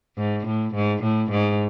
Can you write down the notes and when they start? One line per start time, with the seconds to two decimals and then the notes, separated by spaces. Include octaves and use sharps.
0.17 G#2
0.47 A2
0.75 G#2
1.03 A2
1.31 G#2